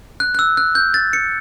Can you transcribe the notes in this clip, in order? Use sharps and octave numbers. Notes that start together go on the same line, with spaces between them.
F#6
F#6
E6
F#6
G6
A6
C#7